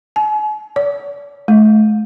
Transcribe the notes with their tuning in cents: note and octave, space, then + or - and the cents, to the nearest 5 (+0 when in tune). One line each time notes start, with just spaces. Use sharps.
G#5 +45
D5 -40
A3 -40